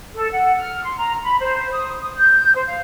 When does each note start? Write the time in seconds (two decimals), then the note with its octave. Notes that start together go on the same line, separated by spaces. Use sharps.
0.16 A4
0.32 F#5
0.58 F6
0.83 C6
0.96 A#5
1.23 B5
1.40 C5
1.71 D#6
2.00 D#6
2.16 G6
2.54 C5
2.67 F5